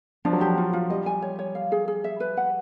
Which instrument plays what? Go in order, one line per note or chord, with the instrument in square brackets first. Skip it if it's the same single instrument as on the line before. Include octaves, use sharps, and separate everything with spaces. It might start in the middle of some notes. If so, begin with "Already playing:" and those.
[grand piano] F3 [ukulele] D4
[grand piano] F#3
[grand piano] F3 [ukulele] G4
[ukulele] F4
F4
[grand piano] G3 [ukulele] D#5
[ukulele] G#5
C#5
C#5
F5
G#4
G#4
E5
B4
F#5